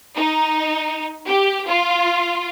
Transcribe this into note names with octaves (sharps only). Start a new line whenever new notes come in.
D#4
G4
F4